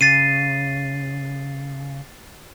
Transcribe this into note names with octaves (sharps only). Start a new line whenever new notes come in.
C#3 A6 C7 D#7